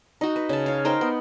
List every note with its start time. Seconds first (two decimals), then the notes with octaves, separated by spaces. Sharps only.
0.21 D#4 F#4
0.36 B4
0.49 C#3 A5
0.66 C#5 F5
0.85 D#4 A#4 C5 G5
1.01 B3